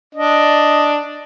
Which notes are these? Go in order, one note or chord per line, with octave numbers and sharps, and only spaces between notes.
D4 D#5